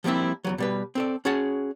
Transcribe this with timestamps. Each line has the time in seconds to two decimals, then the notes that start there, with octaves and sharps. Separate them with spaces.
0.04 F3 G3 A#3 C4 E4
0.45 E2 E3 F#3
0.58 B2 G3 B4
0.95 C4 A4 D5
1.25 C#4 F#4 G#4 F#5 A5